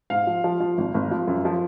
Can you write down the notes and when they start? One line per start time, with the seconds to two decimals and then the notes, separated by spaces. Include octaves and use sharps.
0.10 G#2 F5
0.27 F3
0.44 F3
0.60 F3
0.78 G#1
0.94 G#1
1.11 F3
1.27 F#2
1.45 F3